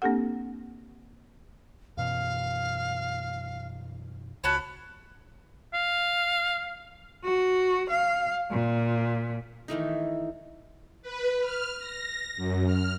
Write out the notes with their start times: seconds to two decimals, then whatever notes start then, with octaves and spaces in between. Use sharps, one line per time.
0.02 A#3 C4 D4 G4 A4 F#5
1.97 F#2 B2 E3 F5
4.44 C#2 F#4 A4 C#5 B5
5.74 F5
7.24 F#4
7.90 F5
8.51 A#2
9.68 D#3 E3 A3 D#4
11.02 B4
11.40 F6
11.79 A#6
12.36 F#2
12.65 F6